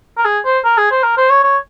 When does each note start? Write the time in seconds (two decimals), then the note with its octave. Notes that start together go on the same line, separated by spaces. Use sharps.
0.18 A#4
0.25 G#4
0.45 C5
0.65 A#4
0.77 G#4
0.91 C5
1.03 A#4
1.18 C5
1.30 C#5
1.44 C#5